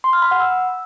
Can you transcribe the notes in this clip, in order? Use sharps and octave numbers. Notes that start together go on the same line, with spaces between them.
C6
F6
B5
F#5
E6